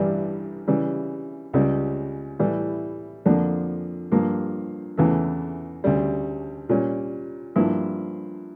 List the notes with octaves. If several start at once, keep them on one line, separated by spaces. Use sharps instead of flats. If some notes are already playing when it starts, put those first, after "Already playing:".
Already playing: A1 G2 E3 G3 D4
C#3 E3 G3
C#2 C#3 G3
A2 E3 G3
F2 D3 F3 A#3 D4
G2 F3 A#3
E2 C#3 E3 A3
D2 C#3 G3
A#2 G3 C#4
G2 F3 A#3 E4